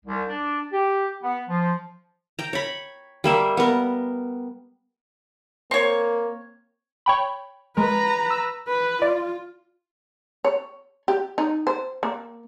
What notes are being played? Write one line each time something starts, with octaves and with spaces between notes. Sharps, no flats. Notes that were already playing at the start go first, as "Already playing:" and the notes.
C2
D4
G4
B3
F3
G5 A#5
C#5 B5
G3 A#3 E5
B3 A#4
A#3 C4 C#5
C#5 G5 B5
G#3 A#4 B4 A#5
E6
B4
F4 D5
C#5
G4
D#4
C5
A#3